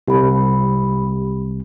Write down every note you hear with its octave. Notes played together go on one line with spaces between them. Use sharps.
C2 G4 B5